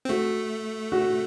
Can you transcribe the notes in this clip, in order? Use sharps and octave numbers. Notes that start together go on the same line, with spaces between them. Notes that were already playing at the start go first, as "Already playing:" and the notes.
C4
A3 F#4
F#4